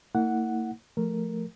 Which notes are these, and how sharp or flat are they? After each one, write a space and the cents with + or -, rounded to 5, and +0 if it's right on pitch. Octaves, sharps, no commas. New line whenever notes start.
A#3 -35 E4 -30 F#5 +0
F3 +0 A3 +0 A#4 +0